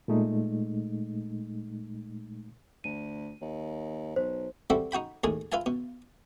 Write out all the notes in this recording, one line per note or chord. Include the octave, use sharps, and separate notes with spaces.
A#2 G#3 A3 D#4
D2 D#7
D#2
B1 C5
G3 C4 E4 F#4 A4
D#4 F#4 G5 B5
D#2 A2 D#3 G#4 G#5
F4 B4 E5 G#5 A5
B2